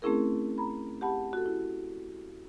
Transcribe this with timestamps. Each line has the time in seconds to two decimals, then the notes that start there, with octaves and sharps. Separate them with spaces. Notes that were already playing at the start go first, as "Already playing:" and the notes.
0.02 A3 C4 C#4 E4 G#4 A#4
0.58 A#5 B5
1.01 G4 F#5 A5 B5
1.33 F#4 A4
1.46 E4